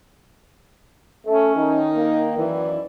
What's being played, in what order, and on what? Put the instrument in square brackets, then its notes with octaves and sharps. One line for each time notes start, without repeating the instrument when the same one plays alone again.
[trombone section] A3 [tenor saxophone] C#4
[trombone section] D#3 [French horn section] D#4
[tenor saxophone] A#3
[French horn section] F#2 E4 D5 [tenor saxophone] E3